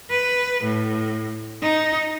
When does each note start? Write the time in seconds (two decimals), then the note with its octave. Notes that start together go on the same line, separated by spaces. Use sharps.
0.11 B4
0.64 A2
1.62 D#4